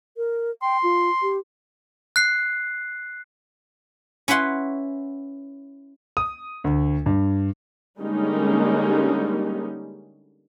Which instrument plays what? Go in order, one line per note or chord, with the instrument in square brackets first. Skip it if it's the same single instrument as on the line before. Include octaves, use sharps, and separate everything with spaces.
[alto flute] A#4
[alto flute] G5 [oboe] C6
[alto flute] F4
G4
[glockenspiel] F#6 C7
[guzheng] C#4 E4 B4 F#5 C6
[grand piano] D#6
D2
G2
[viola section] D3 G3 G#3 A#3 C#4 D#4